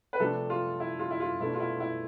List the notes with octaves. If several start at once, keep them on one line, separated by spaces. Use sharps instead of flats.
B4
C3 F3 A3 D4 A4
F4
E4
F4
E4
F4
B2 A3 D4 E4
F4
E4
E4